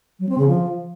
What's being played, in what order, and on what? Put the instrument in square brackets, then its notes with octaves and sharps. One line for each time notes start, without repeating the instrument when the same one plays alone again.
[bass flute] F#3
C4
C#3
F3